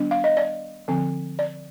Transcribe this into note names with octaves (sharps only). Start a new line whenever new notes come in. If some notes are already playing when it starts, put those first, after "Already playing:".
Already playing: D#3 G3 B3 D4
F5
D#5
D5
D3 F3 C4
D5